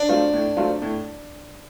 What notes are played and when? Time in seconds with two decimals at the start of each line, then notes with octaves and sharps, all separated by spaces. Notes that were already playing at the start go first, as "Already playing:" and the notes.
Already playing: D4
0.09 F#3 A3 C4 F4
0.34 A2
0.57 F#3 A3 C4 F4
0.82 A2